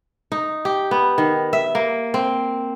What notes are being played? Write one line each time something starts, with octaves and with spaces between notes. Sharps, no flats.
D#4
G4
B3
D#3
E5
A#3
C4